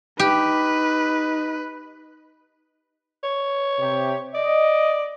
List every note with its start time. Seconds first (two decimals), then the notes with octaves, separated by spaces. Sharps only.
0.19 D#4 G4 B4
3.23 C#5
3.79 C3 G4
4.35 D5 D#5